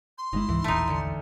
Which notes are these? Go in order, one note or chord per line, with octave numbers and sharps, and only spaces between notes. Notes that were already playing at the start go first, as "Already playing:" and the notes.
C6
G1 D3 G#3 D#4 E4
C#2 G#2 E3 E4
E1 A#1 A3 D#4
D2 D3 C#7